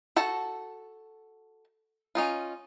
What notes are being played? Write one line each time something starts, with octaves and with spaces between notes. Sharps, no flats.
F#4 A4 A5
C#4 D#4 F4